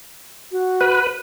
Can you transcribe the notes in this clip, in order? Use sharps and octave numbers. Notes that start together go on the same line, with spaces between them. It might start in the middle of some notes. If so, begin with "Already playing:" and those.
F#4
B4